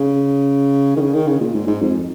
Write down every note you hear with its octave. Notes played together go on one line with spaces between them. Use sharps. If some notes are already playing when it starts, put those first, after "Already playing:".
Already playing: C#3
D#3
C#3
D#3
C#3
A#2
G#2
G#2
F2